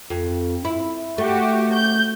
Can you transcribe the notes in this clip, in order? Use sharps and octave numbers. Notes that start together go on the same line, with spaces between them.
F2
E4
A3 F#4 G4
G6